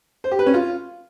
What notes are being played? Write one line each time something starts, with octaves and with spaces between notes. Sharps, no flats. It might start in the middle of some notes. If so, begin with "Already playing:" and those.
C5
G4
B4
C#4
F4